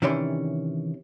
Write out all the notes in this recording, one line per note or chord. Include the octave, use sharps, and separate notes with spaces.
C3 D#3 E3 C#4 D5 C6